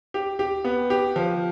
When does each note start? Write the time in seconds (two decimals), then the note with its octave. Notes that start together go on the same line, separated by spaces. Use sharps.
0.14 G4
0.39 G4
0.64 B3
0.90 G4
1.16 F3